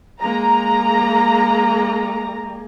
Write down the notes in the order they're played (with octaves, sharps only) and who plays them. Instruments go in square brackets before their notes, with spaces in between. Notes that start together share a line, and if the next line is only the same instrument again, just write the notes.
[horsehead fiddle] G#3 A#3 [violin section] A#5